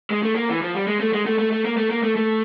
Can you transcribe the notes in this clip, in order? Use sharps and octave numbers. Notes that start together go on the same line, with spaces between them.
G#3
A3
A#3
E3
F3
G3
G#3
A3
G#3
A3
A3
A3
A#3
A3
A#3
A3
A3